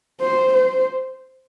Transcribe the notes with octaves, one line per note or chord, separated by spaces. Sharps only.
C5
C5